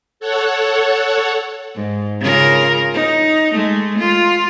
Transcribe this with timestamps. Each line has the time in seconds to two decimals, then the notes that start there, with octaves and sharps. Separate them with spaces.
0.20 A4 C#5 F#5
1.75 G#2
2.21 C#3 F4 A#4
2.94 D#4
3.54 G#3 A3
3.99 F4